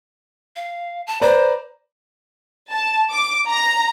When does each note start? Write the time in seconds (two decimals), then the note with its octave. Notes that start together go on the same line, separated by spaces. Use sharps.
0.56 F5
1.07 A5
1.21 B4 C5 D5 A#5
2.71 A5
3.11 D6
3.47 A#5